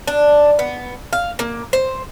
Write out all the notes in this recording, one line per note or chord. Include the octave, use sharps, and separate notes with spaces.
D4
B3
F5
A#3
C5